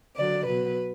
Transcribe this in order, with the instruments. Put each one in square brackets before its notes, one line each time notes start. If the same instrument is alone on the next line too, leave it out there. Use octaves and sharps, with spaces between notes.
[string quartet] D3 F#3 D5
B2 F#3 B4